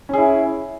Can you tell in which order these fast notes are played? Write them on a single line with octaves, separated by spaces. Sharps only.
C#4 G#4 E4